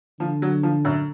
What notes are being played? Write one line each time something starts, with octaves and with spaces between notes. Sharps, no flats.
D3 F3
F#3
F3
F#2